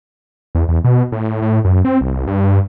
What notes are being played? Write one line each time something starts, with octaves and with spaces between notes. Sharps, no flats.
E2
E2
B2
A2
A2
F#2
C4
C2
G2